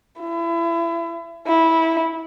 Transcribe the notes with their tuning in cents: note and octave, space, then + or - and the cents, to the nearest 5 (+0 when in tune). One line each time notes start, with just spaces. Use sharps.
E4 +30
E4 -15